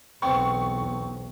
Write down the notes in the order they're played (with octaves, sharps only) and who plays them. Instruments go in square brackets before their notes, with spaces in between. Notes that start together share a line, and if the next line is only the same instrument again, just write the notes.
[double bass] B1 E2 [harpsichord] B3 C4 [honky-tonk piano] C#6